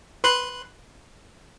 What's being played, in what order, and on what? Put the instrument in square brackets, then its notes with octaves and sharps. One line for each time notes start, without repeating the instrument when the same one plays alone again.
[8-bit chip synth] B4 C6 F#6